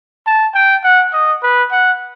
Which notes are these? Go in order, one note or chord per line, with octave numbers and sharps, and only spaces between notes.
A5
G5
F#5
D#5
B4
F#5